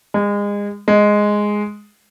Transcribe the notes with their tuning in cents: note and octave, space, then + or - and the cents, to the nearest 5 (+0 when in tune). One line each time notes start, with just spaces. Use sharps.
G#3 -30
G#3 +0